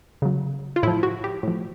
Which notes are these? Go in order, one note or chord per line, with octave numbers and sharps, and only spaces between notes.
C#3 F#3
F4
A2 F3 E4
F#4
G4
A2 F3